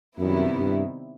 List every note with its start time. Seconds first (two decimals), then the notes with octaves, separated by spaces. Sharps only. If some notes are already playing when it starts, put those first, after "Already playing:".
0.19 F#2 C3 D#3 G3 B3 E4
0.56 G2